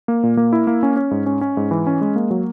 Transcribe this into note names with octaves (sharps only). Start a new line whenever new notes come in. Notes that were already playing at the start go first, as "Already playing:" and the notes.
A#3
A#2
A#3
E4
A#3
C#4
C#4
G#2
C#4
C#4
G#2
E3
C#4
G#3
A#3
F#3